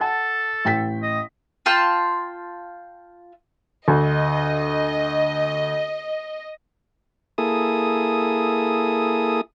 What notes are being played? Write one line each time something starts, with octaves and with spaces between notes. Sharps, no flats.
A4 F#5 A5
A1 G5 B6
D#5
F4 G5 A5 C6
D2 D#5
A#3 E4 G#4 A4 D#6